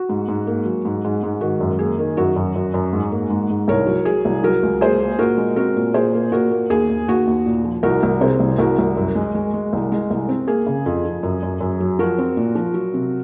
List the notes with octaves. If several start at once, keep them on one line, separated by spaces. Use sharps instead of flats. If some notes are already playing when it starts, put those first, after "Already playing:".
Already playing: F#4
G#2
G#2
A#3
F#3
G#2
G#2
G#2
D#3 F#4
F#2
A#3 G#4
D#3
F#2 F#4
F#2
F#2
F#2
G#2
A#3
G#2
G#2
C2 A#4 C#5
F#3
F#3 G#4
C2
F#3 F#4 A#4
C#2
A#3 G#4 C5
A#3
A#2 F#4 A#4
G#3
C4 F#4 A#4
A#2
A#2 G#4 C5
A#3
A#2 F#4 A#4
A#3
D#2 G#4
D#2
D#2 F#4
D#2
A#2
F3
C2 F#4 A#4
C2
C3 G#4 C5
C2
C2 F#4 A#4
C2
F#2
G#3
G#3
G#3
C2
G#3
C2
C4
A#3 G#4
C#3
F2
F3
F#2
F#2
F#2
F#3
F3 F#4 A#4
C4
A#2
F3
F#3
C3